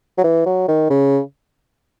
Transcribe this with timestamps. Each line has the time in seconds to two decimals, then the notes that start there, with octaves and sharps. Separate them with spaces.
0.18 F#3
0.24 E3
0.46 F#3
0.68 D#3
0.90 C#3